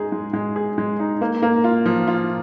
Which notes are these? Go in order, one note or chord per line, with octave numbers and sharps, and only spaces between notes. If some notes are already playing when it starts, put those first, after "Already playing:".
Already playing: G#3 D#4 G#4
G#3
G#3
G#4
G#3
D#4
A#3
A#3
F4
F3
F4